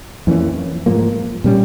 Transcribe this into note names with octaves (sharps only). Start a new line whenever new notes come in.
F2 E3 A#3 C#4
G#2 F3 A#3
A#2 G3 C#4